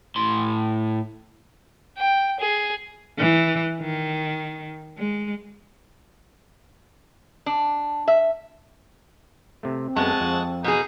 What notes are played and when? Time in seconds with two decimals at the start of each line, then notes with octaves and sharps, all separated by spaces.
0.16 A2 C6
1.98 G5
2.40 G#4
3.19 E3
3.81 D#3
4.98 G#3
7.46 D4
8.08 E5
9.63 C3 A3
9.83 C4
9.96 F#2 G#3 B3 A4 F#5 A5 C#6
10.21 F2
10.64 B2 D#4 G#4